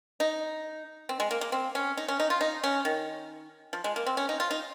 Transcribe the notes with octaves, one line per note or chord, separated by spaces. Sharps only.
D#4
C4
G#3
A#3
A#3
C4
C#4
D#4
C#4
D#4
F4
D#4
C#4
D#3
F3
G#3
A#3
C4
C#4
D#4
F4
D#4